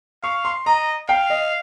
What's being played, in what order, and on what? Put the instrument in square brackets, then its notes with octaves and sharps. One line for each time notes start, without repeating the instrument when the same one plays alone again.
[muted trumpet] F5 [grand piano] C#6
[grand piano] C6
[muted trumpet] D#5 [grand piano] A#5
[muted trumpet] F5 [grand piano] G5
[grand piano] D#5